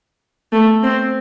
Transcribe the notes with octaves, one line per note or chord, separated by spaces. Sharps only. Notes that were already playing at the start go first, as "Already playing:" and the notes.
A3
C4